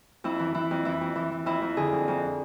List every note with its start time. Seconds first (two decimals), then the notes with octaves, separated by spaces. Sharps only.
0.24 F2 E4
0.39 E3
0.54 E3 E4
0.71 F2
0.85 E3 E4
1.01 F2
1.16 E3
1.32 E3
1.46 F2 E4
1.62 F2
1.77 D3 G#4
1.92 F2
2.08 F2